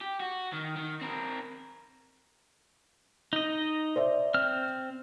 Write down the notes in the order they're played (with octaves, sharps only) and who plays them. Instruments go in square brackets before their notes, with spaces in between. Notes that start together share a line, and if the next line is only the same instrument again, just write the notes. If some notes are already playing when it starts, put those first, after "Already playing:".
[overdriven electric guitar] G4
F#4
D#3
D#3
C4 A#4
[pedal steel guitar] D#4 D#5
[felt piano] C5 D5 E5
[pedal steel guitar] C4 F6